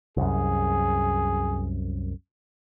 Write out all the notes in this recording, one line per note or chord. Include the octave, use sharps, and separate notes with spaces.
C2 F#2 G#4